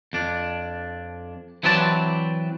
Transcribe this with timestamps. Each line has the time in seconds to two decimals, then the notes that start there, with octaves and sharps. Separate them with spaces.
0.13 F2 D4
1.63 E3 F#3 C4 B4 D5 A5